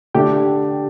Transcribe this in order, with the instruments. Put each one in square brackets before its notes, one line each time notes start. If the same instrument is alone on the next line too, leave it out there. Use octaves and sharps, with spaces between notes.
[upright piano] D3 A3 D4 [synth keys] G4